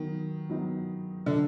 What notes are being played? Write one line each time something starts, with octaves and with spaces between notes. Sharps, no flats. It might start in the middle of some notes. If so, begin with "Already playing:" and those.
Already playing: D#3 F#3 B3 D#4
F#3 B3 D#4
D3